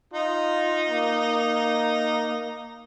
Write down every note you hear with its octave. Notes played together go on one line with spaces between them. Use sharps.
D#4 F4
A#3